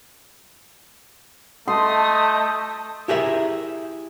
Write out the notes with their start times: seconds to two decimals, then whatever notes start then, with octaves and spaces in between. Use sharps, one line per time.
1.68 A3 D#5 A5 C6 D#6 G6
3.08 E4 G4 G#4 A#4 E5